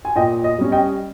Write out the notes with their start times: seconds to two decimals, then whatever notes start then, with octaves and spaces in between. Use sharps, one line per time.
0.05 G#5
0.16 A#2 D#5 G5
0.44 D#5
0.58 G3 C#4
0.72 D#5 G5